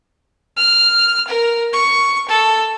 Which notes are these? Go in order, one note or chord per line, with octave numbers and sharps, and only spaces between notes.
F6
A#4
C#6
A4